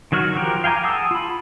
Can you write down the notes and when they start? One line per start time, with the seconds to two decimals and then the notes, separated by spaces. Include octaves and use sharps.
0.12 D#3 F#3 F#4 F6
0.36 F3 G4 A#4
0.64 F5 G5 G#5 A#5 D6
0.83 G#4 F#5 A5 D#6 E6
1.11 F4 B5